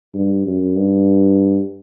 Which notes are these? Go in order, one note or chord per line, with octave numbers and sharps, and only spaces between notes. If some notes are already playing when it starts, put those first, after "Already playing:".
G2
F#2
G2